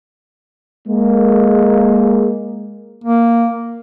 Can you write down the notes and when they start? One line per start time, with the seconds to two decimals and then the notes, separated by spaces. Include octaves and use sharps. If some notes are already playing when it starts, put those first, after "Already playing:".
0.88 G#3 A#3
3.04 A#3